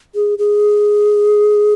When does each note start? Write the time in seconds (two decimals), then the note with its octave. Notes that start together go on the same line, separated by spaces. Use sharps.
0.15 G#4
0.38 G#4